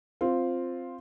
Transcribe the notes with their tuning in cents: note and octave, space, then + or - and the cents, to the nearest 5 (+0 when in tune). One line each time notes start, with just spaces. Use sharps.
C4 +0 F4 +0